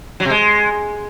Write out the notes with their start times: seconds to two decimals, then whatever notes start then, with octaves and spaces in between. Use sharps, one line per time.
0.20 F#3
0.25 C3
0.30 G#3